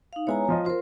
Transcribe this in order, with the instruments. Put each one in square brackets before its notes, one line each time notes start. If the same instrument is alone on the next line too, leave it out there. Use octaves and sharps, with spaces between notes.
[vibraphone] D#4 F5
[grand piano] G#3 B3 E4 [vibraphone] C#5 G#5 A#5
[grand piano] F3 F4 D#5
[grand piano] F4 [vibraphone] A#4 C5